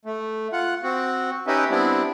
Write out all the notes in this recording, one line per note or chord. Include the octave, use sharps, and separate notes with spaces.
A3
F4 F#5
C4 F#4
C#4 D#4 G4 B4 D#5 E5
G3 B3 C4 D4 E4